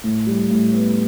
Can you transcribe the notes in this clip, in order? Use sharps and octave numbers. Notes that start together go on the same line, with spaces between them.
A2
G3
A2
B3